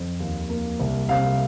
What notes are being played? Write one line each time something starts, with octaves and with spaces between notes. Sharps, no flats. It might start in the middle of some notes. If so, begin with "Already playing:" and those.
Already playing: F2
D#2
A#3
C2
C3 F5